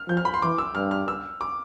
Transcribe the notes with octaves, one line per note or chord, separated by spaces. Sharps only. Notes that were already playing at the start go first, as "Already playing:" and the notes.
Already playing: F6
F3 G6
F6
B5
C6
E3 D6
E6
G2 F6
F6
E6
D6